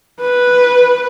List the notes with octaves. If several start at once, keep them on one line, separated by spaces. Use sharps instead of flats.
B4